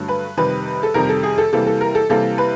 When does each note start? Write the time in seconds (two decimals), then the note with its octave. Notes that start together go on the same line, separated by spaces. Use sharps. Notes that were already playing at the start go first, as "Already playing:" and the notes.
Already playing: G2 D3 F#3 A3
0.08 B4
0.37 F2 C3 D#3 G3 B4
0.83 A4
0.94 F2 C3 D#3 G3 A#4
1.09 A4
1.23 G#4
1.38 A4
1.53 C3 E3 G3 A#3 A4
1.67 A4
1.81 A#4
1.95 A4
2.09 C3 E3 G3 A#3 A4
2.38 B4